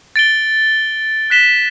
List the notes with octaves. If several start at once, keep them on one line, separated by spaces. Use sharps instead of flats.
A6 D7 G7
F#6 B6 E7 G7